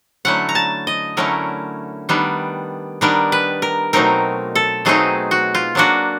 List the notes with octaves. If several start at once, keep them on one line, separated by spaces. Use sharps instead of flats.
D3 F#3 A3 C#4 E4 F#5
A#5
A5
D#5
D3 F#3 A3 C#4 E4 A#4
D#3 G3 B3 D4
D#3 G3 B3 D4 A#4
B4
A#4
B2 F#3 A3 C4 D#4 A#4
A4
B2 F#3 A3 C4 D#4 G#4
F#4
F4
F#3 A#3 D4 F#4